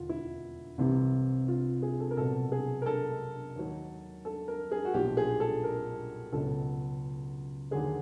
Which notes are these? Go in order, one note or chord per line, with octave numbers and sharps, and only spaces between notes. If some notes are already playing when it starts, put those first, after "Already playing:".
Already playing: E1 D#2 D3 F4
E4
C2 C3 E3
F4
G#4
A4
A#4
C2 B2 F#3 A4
G#4
A#4
A4
D#2 D#3 F#3
A4
A#4
G#4
F#4
B1 A#2 F3 G4
G#4
A4
A#4
C#2 B2 F#3 A4
D#2 D3 F#3 G#4